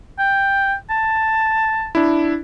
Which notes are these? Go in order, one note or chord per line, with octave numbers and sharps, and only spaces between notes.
G5
A5
D4 E4